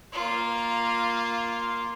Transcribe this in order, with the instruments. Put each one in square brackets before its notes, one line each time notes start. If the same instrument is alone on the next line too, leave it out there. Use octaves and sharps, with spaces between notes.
[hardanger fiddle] A#3 F4